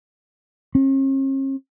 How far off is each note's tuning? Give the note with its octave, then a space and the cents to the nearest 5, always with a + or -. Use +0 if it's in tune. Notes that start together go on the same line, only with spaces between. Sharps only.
C#4 -45